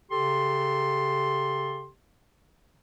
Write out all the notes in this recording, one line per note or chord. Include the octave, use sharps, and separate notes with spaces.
C#3 G4 A4 C6